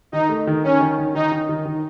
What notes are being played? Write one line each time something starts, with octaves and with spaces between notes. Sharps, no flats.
D#3 D#4
A3
D#3
D#3 C#4
D#3
D#3
D#3 D#4
D#3
D#3
D#3